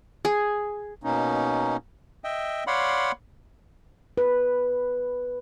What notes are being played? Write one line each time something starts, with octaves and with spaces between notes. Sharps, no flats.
G#4
B2 A#3 C#4 D#4
D#5 E5 G5
C#5 D5 F5 F#5 B5 C6
B4